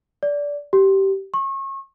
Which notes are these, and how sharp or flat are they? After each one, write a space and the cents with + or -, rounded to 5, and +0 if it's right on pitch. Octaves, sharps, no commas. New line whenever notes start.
D5 -20
G4 -15
C#6 -35